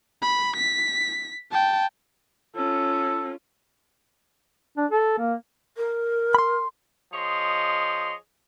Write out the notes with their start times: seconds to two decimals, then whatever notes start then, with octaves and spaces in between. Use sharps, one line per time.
0.22 B5
0.56 B6
1.51 G5 A5
2.56 C#4 F4 A4
4.77 D4
4.91 A4
5.18 A#3
5.77 A#4
6.35 B5 C6
7.13 F3 G#4 C#5 D#5 C6